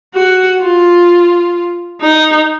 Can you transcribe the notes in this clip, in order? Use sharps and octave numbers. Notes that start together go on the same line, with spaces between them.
F#4
F4
D#4